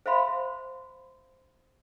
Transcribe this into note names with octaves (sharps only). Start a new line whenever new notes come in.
C5 E5 F5 B5 C6